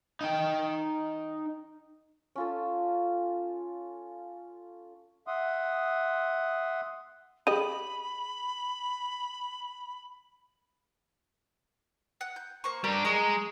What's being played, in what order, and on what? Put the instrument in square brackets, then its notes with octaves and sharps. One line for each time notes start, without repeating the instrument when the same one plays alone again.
[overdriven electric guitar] D#4 G5
[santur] C#4 F4 A4
[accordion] E5 F#5 C6 D#6
[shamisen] G4 D#5 [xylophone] G#4 D#7 [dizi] B5
[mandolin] F#5
G6
A#3 C5 C#6
[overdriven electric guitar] G3 D4 [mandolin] A#4
[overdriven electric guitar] G#3 [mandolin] A#5 C#6 D#6